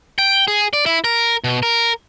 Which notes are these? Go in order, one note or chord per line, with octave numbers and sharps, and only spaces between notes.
G5
G#4
D5
E4
A#4
B2
A#4